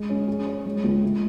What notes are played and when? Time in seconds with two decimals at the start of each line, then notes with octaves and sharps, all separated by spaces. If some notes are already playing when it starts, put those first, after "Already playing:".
Already playing: G#3
0.09 C#4
0.28 G#4
0.46 C#5
0.65 G#3
0.84 C#2
1.02 A3